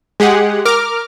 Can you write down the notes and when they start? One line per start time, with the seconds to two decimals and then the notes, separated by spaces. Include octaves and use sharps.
0.20 G#3 G4 G#4 F#5
0.65 A#4 D6 F6